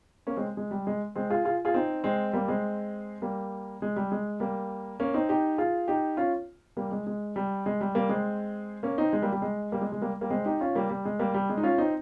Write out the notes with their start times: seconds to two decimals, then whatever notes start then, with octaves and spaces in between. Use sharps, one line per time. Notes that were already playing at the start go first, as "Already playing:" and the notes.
0.27 A#3 C#4
0.36 G#3 C4
0.57 G#3
0.71 G3
0.87 G#3
1.15 G#3 C4
1.30 F4 G#4
1.45 F4 G#4
1.65 F4 G#4
1.74 C4 D#4
2.04 G#3 C4
2.33 G3 A#3
2.48 G#3 C4
3.22 G3 A#3
3.82 G#3
3.96 G3
4.12 G#3
4.40 G3 A#3
5.00 A#3 C#4
5.14 C4 D#4
5.29 D#4 G4
5.58 F4 G#4
5.88 D#4 G4
6.17 C#4 F4
6.77 G3 A#3
6.92 G#3
7.07 G#3
7.36 G3
7.66 G#3
7.81 G3
7.95 G3 A#3
8.09 G#3 C4
8.83 A#3 C#4
8.98 C4 D#4
9.13 G#3
9.22 G3 A#3
9.32 G3
9.42 G#3
9.72 G3 A#3
9.81 G#3
9.92 G#3
10.01 G3 A#3
10.21 G3 A#3
10.30 G#3 C4
10.45 D#4 G4
10.61 C#4 F4
10.75 G3 A#3
10.90 G3
11.05 G#3
11.19 G3 A#3
11.34 G3
11.50 G#3
11.58 D#4
11.63 C#4 F4
11.78 C4 D#4